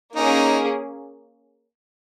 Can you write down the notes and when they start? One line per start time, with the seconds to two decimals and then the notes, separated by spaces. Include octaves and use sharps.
0.15 A#3 C#4 D#4 G#4